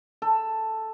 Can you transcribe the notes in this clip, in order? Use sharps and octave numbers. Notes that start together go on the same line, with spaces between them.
A4